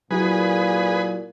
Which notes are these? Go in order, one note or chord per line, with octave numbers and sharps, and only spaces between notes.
A#2 F#3 E4 F#4 G#4 B4